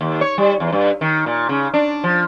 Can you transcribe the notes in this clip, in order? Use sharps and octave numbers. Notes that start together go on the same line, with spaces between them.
D#2
C#5
G3
E2
G2
D#3
A#2
C#3
D4
F3